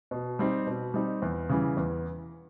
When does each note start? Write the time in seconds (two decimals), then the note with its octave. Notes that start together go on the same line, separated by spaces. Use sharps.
0.11 B2
0.39 G3 C4 D#4
0.67 B2
0.94 G3 C4 D#4
1.22 E2
1.49 C#3 E3 G3
1.77 E2